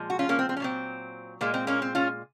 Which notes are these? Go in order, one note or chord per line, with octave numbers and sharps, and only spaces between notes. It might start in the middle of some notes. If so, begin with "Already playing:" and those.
Already playing: A#2 F3 G#3
F#4
C#4 F4
A#3 C#4
C4
C4
C#4
A#2 F#3 C4
A#2 G#3 A#3
C4
A#3 C#4
C4
C#4 F4